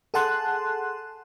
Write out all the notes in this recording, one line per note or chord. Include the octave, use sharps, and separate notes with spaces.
G#4 A4 F#5 A5 C6 F#6